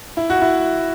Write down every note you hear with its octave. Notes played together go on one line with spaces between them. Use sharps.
E4
F#4
E4